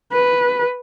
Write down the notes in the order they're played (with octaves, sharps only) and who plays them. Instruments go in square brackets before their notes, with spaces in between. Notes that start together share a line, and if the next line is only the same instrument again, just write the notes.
[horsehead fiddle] B4